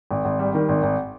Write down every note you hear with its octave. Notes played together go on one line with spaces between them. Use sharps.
G#1
G#1
G3
D#3
G#1
G#1